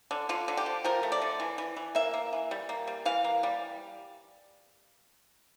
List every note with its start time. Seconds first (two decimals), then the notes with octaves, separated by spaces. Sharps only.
0.11 D3
0.29 D3 F4
0.48 D3
0.57 G4
0.66 F3
0.84 F3 A#4
1.03 A3
1.12 D5
1.22 D3
1.40 E3
1.58 E3
1.76 E3
1.95 A#3 E5
2.14 A#3
2.33 E3
2.51 G3
2.69 A#3
2.87 G3
3.05 E3 F5
3.24 A#3
3.43 G3